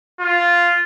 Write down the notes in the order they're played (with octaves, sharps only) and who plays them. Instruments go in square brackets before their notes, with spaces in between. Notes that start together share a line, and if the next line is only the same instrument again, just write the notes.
[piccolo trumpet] F4